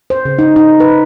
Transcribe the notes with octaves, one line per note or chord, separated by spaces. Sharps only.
C5
C#3
D#4
D#4
B4